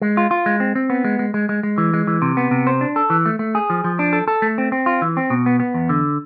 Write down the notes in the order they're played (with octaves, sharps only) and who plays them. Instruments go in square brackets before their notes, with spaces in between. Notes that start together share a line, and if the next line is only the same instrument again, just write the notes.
[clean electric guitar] G#3
F4
F4
G#3
C4
C4
B3
G#3
G#3
G#3
G#3
G#3
E3
G#3
E3
C3
B3
C3
C5
D4
A4
E3
A3
A3
G#4
F3
F3
D4
A4
A4
A3
C4
C4
F4
E3
C4
B2
B3
B3
E2
D3